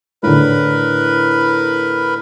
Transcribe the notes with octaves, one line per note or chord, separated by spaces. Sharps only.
A2 D3 A#4 B4 B5